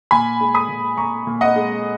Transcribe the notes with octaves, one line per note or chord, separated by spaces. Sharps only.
A#2 G#5 B5
G#3
B5 D#6
A#2
A#2 A#5 C#6
A#2
D#5 F#5
G#3